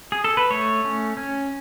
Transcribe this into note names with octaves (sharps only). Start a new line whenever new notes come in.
G#4
A4
B4
A3 C#5
C#4
C#4